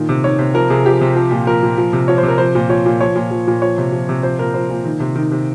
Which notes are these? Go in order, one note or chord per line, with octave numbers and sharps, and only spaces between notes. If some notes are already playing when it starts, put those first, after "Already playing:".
Already playing: A#2 D#3
C3
D#3 C#5
C3
F3 A#4
C3 G#4
F3 G4
C3
F3
A#2
F3 A#4
A#2
F3
C3
F3 C#5
C5
C3
A#4
F3 C5
A#2
F3 C#5
A#2
F3 C#5
A#2
F3
A#2
F3 C#5
C3
F3
C3
F3 C5
A#2 A#4
F3 C5
A#2
D#3
C3
D#3
C3